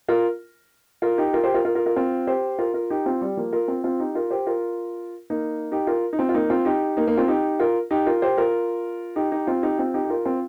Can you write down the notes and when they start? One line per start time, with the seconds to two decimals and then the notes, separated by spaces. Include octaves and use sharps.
0.08 F4 A#4
1.02 F4 A#4
1.18 D#4 G4
1.33 F4 A#4
1.43 G4 C5
1.54 F4 A#4
1.65 F4 A#4
1.75 F4 A#4
1.86 F4 A#4
1.96 C4 F4
2.27 G4 C5
2.58 F4 A#4
2.74 F4 A#4
2.90 D#4 G4
3.06 C4 F4
3.21 G3
3.37 F3 A#3
3.53 F4 A#4
3.68 C4 F4
3.84 C4 F4
4.00 D#4 G4
4.15 F4 A#4
4.31 G4 C5
4.47 F4 A#4
5.30 A#3 D#4
5.72 D#4 G4
5.87 F4 A#4
6.13 D#4
6.19 C4 F4
6.29 F4
6.34 A#3 D#4
6.50 C4 F4
6.65 D#4 G4
6.97 A#3 D#4
7.07 A#3 D#4
7.17 C4 F4
7.28 D#4 G4
7.60 F4 A#4
7.91 D#4 G4
8.06 F4 A#4
8.22 G4 C5
8.37 F4 A#4
9.16 D#4 G4
9.32 D#4 G4
9.47 C4 F4
9.63 D#4 G4
9.78 C4 F4
9.94 D#4 G4
10.04 G4
10.10 F4 A#4
10.25 C4 F4